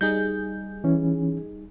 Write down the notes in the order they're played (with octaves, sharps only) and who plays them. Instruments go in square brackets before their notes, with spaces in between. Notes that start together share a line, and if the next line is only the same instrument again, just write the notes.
[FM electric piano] G3 D#4 G#4 [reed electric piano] G6
[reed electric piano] E3 C#4